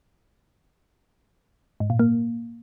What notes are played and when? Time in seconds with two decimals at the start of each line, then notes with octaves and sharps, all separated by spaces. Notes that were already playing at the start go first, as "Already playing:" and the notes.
1.80 G#2
1.90 A#2
1.99 A#3